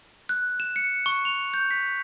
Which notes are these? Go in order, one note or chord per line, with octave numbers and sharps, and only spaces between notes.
F#6
E7
C#7
C#6
F7
G6
B6